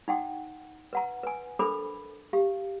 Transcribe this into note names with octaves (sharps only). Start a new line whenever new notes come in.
D#4 F#5 G5
B4 F#5 A#5
B4 G#5
D4 A4 A#4 C5 B5 D6
G4 F5